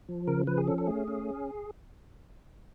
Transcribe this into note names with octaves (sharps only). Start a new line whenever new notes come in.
F3
C#3 A#4
F3 B4
G#4
C#4 A4
A4
A3 G#4
C#4